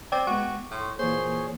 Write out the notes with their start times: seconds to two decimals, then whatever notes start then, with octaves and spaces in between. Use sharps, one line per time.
0.12 C4 D5 G5 D6
0.27 G#3 B3 F#4 C#6
0.71 A2 A4 C6
0.99 A#2 E3 A#3 G#4 C5 C#5